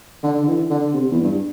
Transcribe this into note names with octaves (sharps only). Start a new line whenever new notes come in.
D3
D3
E3
D3
C3
E2
G2